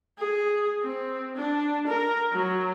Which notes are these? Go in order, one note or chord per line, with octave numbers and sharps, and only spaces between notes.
G#4
C4
D4
A#4
F#3